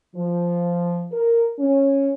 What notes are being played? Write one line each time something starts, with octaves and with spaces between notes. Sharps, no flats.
F3
A#4
C#4